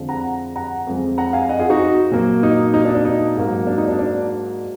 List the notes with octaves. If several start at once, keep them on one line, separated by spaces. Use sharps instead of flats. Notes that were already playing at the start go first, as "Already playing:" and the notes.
Already playing: F2 D3 F3 G#3
F#5 A#5
F#5 A#5
F2 F3 G#3
F#5 A#5
F5 G#5
D#5 F#5
F4 G#4
D#4 F#4
A#2 F#3 A#3
D#4
D#4
D4
D4
D#4
G#2 F#3 A#3
D4
D#4
D4
D4